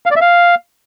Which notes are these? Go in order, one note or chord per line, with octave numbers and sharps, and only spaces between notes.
F5
D5
E5
F5